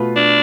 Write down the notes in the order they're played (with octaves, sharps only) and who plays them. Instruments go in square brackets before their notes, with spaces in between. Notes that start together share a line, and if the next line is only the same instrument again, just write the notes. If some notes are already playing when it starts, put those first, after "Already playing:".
Already playing: [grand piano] B2 A3 F4 B4
[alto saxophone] D4